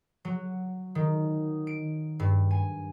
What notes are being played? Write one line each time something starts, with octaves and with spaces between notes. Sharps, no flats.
F#3
D#3
D7
G2
G#5